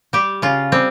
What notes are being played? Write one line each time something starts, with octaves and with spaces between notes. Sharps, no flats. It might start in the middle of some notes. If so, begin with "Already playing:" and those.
G3 G4
C#3 F4
G3 C4